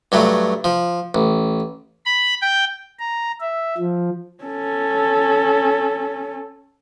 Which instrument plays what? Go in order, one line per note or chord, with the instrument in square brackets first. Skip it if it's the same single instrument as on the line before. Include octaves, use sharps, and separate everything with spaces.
[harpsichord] G2 F#3 A3
F3
A1
[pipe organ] B5
G5
A#5
E5
F3
[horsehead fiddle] C#4 A4